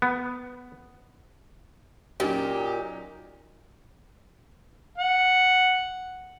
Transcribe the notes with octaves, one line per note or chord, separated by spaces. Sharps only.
B3
A#2 F#3 C#4 D#4 G4
F#5